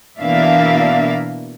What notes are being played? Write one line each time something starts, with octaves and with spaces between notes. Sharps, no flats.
B2 E3 A#3 D4 E5 F5